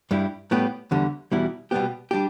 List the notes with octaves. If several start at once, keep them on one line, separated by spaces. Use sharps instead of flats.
G2 G3 E4 G4
A2 G3 B3 G4
E2 D3 G3
E2 B2 G3 E4
B2 G3 B3 G4
G3 D4 G4